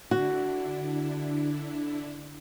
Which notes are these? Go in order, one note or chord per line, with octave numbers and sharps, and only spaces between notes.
D3 D4 E4 F#4